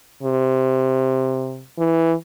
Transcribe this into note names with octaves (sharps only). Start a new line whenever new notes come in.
C3
E3